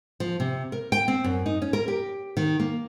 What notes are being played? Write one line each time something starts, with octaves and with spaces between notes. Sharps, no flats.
F3
C3
A#4
G5
C4
F#2
D#4
C#4
A#4
G4
D#3
A#3